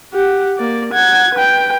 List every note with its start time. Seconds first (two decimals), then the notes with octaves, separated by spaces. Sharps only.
0.14 G4 F#5
0.59 A#3 D5
0.93 F#5 G#6
1.35 B4 G5